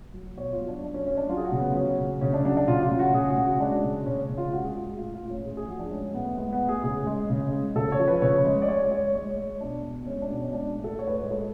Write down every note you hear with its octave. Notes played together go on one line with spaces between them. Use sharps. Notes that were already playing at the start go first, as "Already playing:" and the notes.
F#3
B2 C#5
F4
F#3
D4
F#3 D4
C#4
F#3 C#4
D4
F#3 F4
G#4
F#4
C#3
B3
F#3 C#4
C#3
C#3 C#4
D4
F#3 D4
D4
C#3 F4
F4
C#3
F#4
C#3 G#4
F#4
C#3
F#4
G#3 D4
C#3
C#3 C#4
C#4
C#3
F4
G#3 F#4
G#4
G#3 F4
F4
A2 F4
F4
A2
C#4
A2 G#4
G#4
F3 F#4
D4
G#3 C#4
A2 B3
G#3 B3
B3
A2
G#4
C#3 G#4
G#3
C#3
G#3
C#3 A4
C#5
F3
B4
C#3 C#5
G#3
D5
G#3 C#5
G#3 C#5
G#3 C#5
G#3
B2 D4
B2
G#3 C#4
D4
B2
C#4
G#3 D4
A2
A4
A2 C#5
B4
C#5
G#3
A4